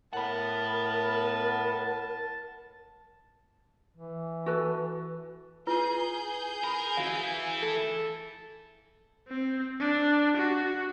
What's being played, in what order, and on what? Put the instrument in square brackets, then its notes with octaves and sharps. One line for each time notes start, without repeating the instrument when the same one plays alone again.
[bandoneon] A2 [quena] A#4 [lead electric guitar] F#5 B5 [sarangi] A5
[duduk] E3
[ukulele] F#4 A4 B4
[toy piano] E4 F4 B4 [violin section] G#4 G6
[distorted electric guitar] A#4 [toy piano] B5
[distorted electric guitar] E3 E4 [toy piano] F#4 F5
[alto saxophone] A4
[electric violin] C4
D4
F#4